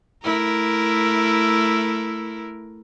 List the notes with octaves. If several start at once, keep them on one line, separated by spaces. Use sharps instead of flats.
A3 E4 A#4